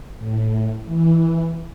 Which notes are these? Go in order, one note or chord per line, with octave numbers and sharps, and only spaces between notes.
A2
E3